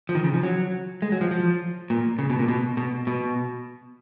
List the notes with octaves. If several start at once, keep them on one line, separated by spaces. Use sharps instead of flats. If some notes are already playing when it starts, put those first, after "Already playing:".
F3
D#3
C#3
F3
F#3
G#3
F#3
F3
F3
A#2
C#3
B2
A#2
B2
B2
B2